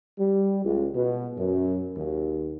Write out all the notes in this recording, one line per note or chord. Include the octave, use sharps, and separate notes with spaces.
G3
C#2
B2
F#2
D#2